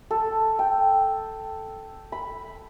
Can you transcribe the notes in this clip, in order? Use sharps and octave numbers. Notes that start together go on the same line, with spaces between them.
A4
G5
B5